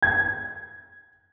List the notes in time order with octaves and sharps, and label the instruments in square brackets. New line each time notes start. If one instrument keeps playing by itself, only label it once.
[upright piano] G#6